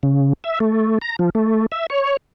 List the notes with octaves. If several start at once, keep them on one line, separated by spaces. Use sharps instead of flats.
C#3
E5
A3
A#5
F3
A3
E5
C#5